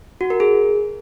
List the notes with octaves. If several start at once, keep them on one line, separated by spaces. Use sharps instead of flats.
F#4
A#4
G#4